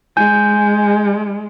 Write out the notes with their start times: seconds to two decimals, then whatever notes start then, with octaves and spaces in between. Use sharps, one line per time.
0.17 G#3 G#5 G6